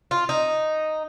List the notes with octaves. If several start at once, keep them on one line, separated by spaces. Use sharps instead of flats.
F4
D#4